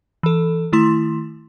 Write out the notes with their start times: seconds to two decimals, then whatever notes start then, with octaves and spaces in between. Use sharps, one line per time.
0.23 E3 A4
0.72 D#3 A3 E4 C6